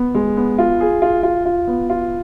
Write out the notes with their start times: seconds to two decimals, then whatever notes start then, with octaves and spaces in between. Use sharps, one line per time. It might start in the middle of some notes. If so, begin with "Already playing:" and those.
Already playing: B3
0.15 G#3
0.37 B3
0.58 F4
0.81 G#4
1.02 F4
1.23 F4
1.46 F4
1.67 B3
1.90 F4